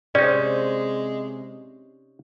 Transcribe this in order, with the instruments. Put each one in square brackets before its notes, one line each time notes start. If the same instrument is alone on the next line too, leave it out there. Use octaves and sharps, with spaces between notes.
[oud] C3 [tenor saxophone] G#3 [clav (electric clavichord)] C#4 D#4 [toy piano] D5